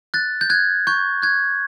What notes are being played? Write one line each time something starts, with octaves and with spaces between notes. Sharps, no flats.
F#6 A6
G6
F#6 G#6
C#6 G6
F#6 G#6